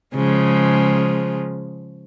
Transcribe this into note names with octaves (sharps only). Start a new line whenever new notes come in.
C#3 F3 G#3